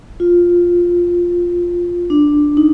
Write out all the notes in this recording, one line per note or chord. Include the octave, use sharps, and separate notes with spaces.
F4
D4
D#4